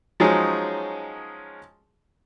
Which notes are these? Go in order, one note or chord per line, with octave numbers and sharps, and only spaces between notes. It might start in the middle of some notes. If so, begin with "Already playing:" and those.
F3 F#3 G#3 C#4 D#4 G#4